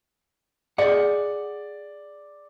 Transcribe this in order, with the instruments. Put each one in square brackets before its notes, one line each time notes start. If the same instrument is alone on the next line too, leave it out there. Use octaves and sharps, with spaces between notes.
[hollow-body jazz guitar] G#4 F#5 [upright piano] D5